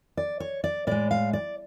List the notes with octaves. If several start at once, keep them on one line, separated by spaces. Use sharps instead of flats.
D5
C#5
D5
A2 G#3 D5
F5
D5